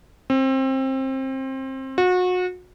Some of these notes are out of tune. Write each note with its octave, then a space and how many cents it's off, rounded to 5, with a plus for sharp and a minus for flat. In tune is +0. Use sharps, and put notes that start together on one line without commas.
C4 +25
F#4 -30